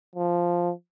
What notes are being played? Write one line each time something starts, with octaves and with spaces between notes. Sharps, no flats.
F3